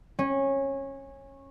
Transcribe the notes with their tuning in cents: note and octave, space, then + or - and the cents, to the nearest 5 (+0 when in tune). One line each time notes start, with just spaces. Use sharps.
C#4 -20